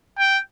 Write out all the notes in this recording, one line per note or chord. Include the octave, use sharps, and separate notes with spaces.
G5